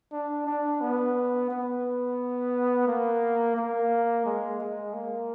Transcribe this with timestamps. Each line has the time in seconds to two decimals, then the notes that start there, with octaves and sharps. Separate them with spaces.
0.12 D4
0.47 D4
0.81 B3
1.50 B3
2.87 A#3
3.56 A#3
4.25 G#3
4.60 G#3
4.94 A#3